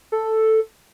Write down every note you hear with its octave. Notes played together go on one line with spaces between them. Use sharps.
A4